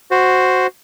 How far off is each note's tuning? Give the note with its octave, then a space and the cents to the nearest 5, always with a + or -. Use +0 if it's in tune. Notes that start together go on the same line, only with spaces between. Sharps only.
F#4 +0 C5 +0